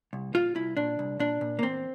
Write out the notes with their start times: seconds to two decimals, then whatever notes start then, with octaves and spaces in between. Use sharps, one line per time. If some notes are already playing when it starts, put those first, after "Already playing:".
0.13 C2
0.34 A#2 F4
0.55 C2 E4
0.77 A#2 D4
0.99 C2
1.19 A#2 D4
1.41 A#2
1.59 A#3
1.62 E2 C4